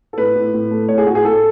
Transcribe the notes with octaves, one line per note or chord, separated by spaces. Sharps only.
A4
A2 B4
A2
A2
A3
A2 C#5
G#4
A2 F#4
G#4
A3 A4